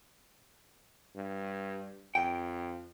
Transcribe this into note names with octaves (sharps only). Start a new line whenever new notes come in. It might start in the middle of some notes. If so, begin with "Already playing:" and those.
G2
F2 G5